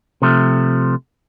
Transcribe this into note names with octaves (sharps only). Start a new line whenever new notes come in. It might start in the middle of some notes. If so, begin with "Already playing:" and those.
C3 F3 A3